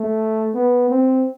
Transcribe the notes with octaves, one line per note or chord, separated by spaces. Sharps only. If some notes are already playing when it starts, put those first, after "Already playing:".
Already playing: A3
B3
C4